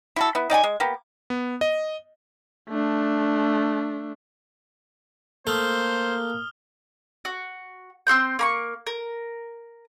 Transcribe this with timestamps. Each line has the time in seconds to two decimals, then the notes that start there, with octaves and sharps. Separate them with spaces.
0.16 E4 F#4 A4
0.35 B3 E4
0.50 D#4 D5 G5 G#5
0.63 G#3
0.80 A#3 B3 G4
1.30 B3
1.61 D#5
2.69 A3 D4
5.47 A3 A#3 C5 D#6 F6 G7
7.25 F#4
8.07 C4 A4 C6 G6
8.39 A#3 B5 C#6
8.87 A#4